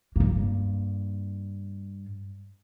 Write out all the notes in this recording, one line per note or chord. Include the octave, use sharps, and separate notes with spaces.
G2 A#3